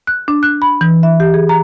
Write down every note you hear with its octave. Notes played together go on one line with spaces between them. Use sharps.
F#6
D4
F#6
B5
E3
E5
G4
G#4
A#5